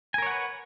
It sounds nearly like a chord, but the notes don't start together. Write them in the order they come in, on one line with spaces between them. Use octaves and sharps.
G#5 A#4 C#5 F#5 B4